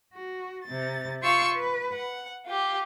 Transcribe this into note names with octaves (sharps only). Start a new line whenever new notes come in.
F#4
C3 A6
F4 F5 G5 C6 C#6 E6
B4
F#5
F4 G4